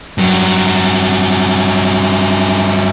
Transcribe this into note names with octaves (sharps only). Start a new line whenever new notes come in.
G2 F#3